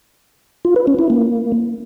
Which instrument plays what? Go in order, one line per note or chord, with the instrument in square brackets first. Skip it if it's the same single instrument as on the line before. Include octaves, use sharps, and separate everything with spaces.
[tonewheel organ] F4
B4
C#4
E4
A#3